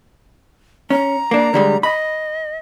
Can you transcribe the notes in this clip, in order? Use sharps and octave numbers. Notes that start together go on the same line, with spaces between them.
C#4 A#5
A#3 D4
D3 G3 G#3
D#5 B5